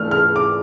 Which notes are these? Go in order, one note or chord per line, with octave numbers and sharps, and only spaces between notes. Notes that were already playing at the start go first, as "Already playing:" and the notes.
Already playing: E3 A3 D4 F6
F6
D6